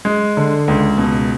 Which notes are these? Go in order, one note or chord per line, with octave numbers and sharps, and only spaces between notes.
G#3
D3
C#2
B2